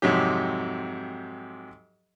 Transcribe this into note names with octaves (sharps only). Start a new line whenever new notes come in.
F2 G#2 C3 F#3 G4